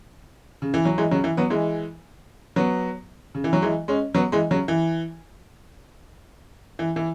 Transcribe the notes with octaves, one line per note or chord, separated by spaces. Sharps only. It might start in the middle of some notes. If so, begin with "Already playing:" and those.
C#3
E3
F#3
E3 G#3
C#3 F#3
E3
F#3 B3
E3 G#3
F#3 B3
C#3
E3
F#3
E3 G#3
G#3 C#4
F#3 B3
E3 G#3
C#3 F#3
E3
E3
E3